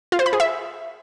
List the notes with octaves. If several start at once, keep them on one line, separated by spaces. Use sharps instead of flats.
F4
C5
B5
G#4
E5